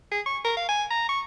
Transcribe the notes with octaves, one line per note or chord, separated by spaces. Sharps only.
G#4
C#6
A#4
F5
G#5
A#5
C#6